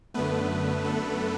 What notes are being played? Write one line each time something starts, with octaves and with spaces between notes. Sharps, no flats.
F#2 D3 A3 B3 B4
A3 A4